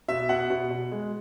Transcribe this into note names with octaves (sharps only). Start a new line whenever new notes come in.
B2 E5
B2 F#5
B2
B2
G#3